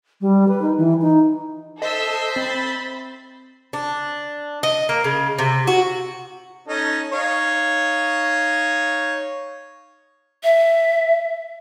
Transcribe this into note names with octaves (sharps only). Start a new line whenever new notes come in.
G3
B4
D#4
E3
D#4
A4 C5 D#5 E5 E6
C4 B5 A6
D4
D#5
A#3
C#3
C3
F#4
C#4 D#4 A4
D#4 C#5 F5
E5